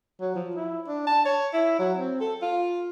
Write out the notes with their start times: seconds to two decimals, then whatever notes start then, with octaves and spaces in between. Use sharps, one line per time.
0.21 F#3
0.35 F3
0.56 E4
0.88 D4
1.07 A5
1.25 C#5
1.53 E4
1.79 F#3
1.97 C4
2.21 A4
2.42 F4